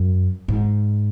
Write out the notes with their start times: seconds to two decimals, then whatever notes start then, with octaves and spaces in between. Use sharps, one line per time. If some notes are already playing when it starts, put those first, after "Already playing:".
Already playing: F#2
0.48 G#2